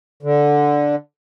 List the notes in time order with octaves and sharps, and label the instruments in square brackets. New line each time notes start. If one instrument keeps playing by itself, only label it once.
[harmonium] D3